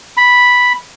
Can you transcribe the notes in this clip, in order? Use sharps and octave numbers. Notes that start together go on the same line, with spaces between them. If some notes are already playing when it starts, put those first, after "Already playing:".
B5